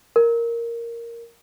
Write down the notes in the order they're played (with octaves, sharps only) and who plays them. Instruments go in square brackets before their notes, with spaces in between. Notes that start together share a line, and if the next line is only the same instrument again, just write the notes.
[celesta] A#4